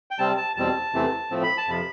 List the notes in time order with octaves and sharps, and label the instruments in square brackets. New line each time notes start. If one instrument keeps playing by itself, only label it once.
[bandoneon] G5
C3 G3 C4 A5
A5
E2 B2 G3 C4 A5
E2 C3 E3 A3 C4
A2 F3 A3 C4
B5
A5
F2 C3 F3 B5